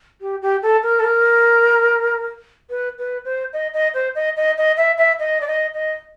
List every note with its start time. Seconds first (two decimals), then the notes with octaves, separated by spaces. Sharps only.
0.21 G4
0.42 G4
0.62 A4
0.83 A#4
1.00 A4
1.04 A#4
2.70 B4
2.98 B4
3.25 C5
3.53 D#5
3.74 D#5
3.94 C5
4.15 D#5
4.37 D#5
4.58 D#5
4.77 E5
4.98 E5
5.19 D#5
5.41 D5
5.48 D#5
5.74 D#5